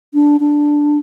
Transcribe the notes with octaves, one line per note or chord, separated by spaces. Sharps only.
D4
D4